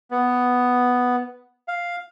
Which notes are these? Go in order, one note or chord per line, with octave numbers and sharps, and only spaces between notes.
B3
F5